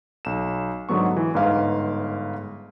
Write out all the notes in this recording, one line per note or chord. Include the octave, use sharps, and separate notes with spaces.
B1 E7
G#2 D3 F#3 B3 C#6
E3
G1 G#2 B4 F5